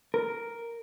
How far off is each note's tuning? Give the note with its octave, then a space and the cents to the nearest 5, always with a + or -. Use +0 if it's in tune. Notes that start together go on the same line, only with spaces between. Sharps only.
A#4 +0